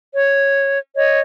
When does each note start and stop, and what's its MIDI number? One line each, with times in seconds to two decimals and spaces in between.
0.13 0.79 73
0.96 1.20 73
0.96 1.20 75